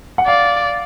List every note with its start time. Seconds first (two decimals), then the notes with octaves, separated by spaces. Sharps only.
0.18 F#5
0.27 D5 F5